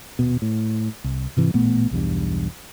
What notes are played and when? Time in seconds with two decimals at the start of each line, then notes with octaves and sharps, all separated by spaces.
0.19 D#1 B2
0.42 A2
1.04 C2
1.37 G#2 C3 E3
1.54 A1 A#2 A3 B3
1.91 B1 E2 G2